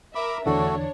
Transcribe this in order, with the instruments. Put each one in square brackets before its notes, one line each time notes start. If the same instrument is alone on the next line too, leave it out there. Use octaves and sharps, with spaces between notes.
[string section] A#4 E5 [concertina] B5 D6
[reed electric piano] E2 D3 E3 [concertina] A3 F#4 A4 [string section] D4 C#5